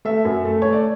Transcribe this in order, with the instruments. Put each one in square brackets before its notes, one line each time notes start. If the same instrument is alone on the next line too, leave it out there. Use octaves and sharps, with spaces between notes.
[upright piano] A3 E5
F#2
A3
A3 C#5
D5